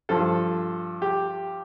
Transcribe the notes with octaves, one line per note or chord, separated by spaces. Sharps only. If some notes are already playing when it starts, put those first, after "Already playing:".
G2 F3 A4
G4